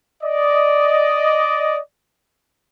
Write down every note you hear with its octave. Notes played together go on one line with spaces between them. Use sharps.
D5 D#5